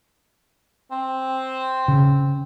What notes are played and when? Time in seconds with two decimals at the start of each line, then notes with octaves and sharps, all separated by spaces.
0.92 C4
1.88 C#3